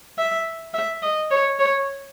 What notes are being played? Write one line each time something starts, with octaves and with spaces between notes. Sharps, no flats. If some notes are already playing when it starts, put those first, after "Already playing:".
E5
E5
D#5
C#5
C#5